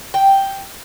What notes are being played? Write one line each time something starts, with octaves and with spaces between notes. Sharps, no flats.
G5